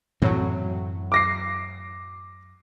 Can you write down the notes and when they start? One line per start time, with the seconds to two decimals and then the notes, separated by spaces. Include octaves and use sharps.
0.22 F#2 A2 E3 F#3 C4
1.12 D6 A#6 C7